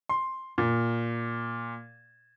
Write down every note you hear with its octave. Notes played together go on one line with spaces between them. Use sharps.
C6
A#2